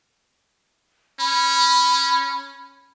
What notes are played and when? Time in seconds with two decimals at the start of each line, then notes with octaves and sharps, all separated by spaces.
1.20 C#4 B5